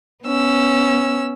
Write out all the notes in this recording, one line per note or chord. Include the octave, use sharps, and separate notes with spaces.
B3 C#4 E6